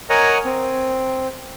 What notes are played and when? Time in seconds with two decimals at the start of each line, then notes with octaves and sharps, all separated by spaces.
0.10 A#4 C#5 D#5 F#5 G#5 A#5
0.45 C4